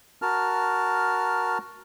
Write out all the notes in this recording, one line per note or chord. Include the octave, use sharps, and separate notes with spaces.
F#4 A#4 A5 F6